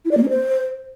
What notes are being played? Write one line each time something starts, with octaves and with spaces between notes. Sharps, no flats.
E4
D5
A#3
C#4
C5